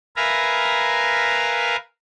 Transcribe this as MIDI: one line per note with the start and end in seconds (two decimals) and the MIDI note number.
0.16 1.76 70
0.16 1.76 71
0.16 1.76 76
0.16 1.76 77
0.16 1.76 80
0.16 1.76 82